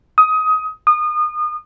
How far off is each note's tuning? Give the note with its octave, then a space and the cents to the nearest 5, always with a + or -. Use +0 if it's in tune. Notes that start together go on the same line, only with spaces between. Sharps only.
D#6 +20
D#6 -30